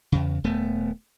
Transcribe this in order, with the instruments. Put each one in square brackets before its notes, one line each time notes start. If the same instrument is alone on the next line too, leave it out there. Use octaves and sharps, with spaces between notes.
[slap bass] E2 C#3
D#1 A3 B3